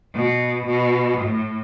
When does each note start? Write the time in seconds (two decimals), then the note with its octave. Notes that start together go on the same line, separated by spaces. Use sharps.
0.14 B2
0.67 B2
1.20 A2